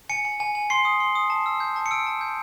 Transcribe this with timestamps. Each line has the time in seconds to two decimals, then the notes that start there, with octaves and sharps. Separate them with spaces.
0.09 G#5 C#7
0.25 G#5
0.40 G#5
0.55 G#5
0.70 C6 C7
0.85 D#6
1.00 C6
1.15 D#6
1.30 A5
1.46 E6
1.60 G6
1.76 A5
1.86 C#7
1.91 E6 D7
2.07 A5
2.21 G6